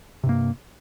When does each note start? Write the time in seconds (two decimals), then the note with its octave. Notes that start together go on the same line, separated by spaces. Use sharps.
0.23 C3
0.26 G2
0.29 A#3